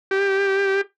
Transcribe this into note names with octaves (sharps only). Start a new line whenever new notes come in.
G4